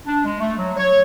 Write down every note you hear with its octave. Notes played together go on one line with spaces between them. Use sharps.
D4
G#3
A3
F#3
C#5